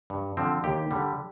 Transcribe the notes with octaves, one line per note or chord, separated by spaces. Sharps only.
G2
D3 F3 C4
D#2 G4
D3 G3